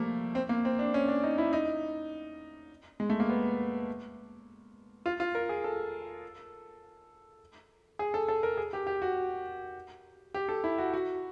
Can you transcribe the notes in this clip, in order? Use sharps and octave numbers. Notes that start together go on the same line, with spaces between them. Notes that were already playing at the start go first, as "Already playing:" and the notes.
Already playing: F3 G3 A3 A#3
C4
A#3
C4
D4
C#4
D4
D#4
E4
D#4
G#3
A3
A#3
B3
F4
F4
A#4
G#4
A4
G#4
A4
A4
A#4
G#4
G4
G4
F#4
G4
A4
E4
F#4
F#4